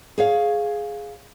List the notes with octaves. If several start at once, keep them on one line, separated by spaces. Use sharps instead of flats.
G#4 C#5 F5